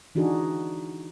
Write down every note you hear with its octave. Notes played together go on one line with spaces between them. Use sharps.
E3 D4 D#4 F#4 G#4